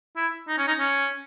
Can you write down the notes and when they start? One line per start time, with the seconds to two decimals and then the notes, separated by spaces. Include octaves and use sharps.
0.17 E4
0.48 D#4
0.58 C#4
0.68 D#4
0.79 C#4